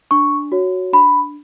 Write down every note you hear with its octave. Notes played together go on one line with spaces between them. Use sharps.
D4 C#6
F#4 C#5
D4 B5